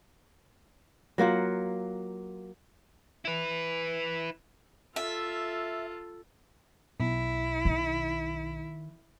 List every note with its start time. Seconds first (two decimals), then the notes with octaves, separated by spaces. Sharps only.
1.18 F#3 A#3 F4 F#5
3.25 E4 B4
4.96 F4 A4 E5
7.00 B1 E4
7.65 D#3